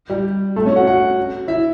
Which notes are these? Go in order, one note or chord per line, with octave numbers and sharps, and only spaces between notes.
G3 G4
A3 A4
C#4 C#5
F#4 F#5
F#4 F#5
E4 E5